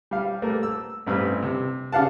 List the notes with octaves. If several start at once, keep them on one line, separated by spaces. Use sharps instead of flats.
G3 F5
G3 A3 A#3
E6
A1 G2 C4 B4
C3
C#3 D4 F5 F#5 A5